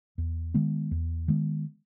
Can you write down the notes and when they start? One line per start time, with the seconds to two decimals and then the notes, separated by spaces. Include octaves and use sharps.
0.18 E2
0.54 D#3 G#3 B3
0.91 E2
1.28 D#3 G#3 B3